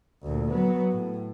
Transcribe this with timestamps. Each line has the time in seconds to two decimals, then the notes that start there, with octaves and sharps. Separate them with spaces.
0.22 D2 A#2
0.51 F#3 B3
0.91 A2